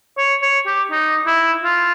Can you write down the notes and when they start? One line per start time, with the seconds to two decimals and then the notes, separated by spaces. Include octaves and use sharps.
0.18 C#5
0.42 C#5
0.66 G4
0.91 D#4
1.27 E4
1.64 F4